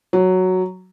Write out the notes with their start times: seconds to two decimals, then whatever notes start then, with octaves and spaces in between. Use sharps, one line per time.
0.13 F#3